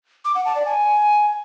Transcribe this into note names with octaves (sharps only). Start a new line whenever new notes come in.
D6
F#5
A5
D5
G#5